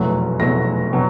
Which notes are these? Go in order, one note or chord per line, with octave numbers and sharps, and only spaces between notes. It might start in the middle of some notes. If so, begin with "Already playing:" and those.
Already playing: F1 E2 B2 F#3 A3
F1 E2 B2 F#3 A3 A#6
B2 F#3